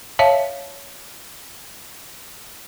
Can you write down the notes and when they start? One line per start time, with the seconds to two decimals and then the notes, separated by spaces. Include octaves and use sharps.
0.19 C#5 E5 F5 A5